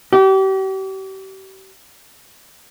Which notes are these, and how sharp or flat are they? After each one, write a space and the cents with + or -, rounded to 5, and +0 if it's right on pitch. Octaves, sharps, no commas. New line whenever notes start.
G4 -35